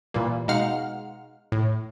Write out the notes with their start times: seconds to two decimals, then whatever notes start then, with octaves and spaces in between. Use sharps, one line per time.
0.14 A#2 E3 G3 A#3
0.48 B2 G#3 D#4 F5 F#5 F6
1.52 A2